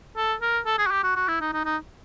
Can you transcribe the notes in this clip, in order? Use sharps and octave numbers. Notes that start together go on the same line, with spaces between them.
A4
A#4
A4
G#4
F#4
G4
F#4
F#4
E4
D#4
D#4
D#4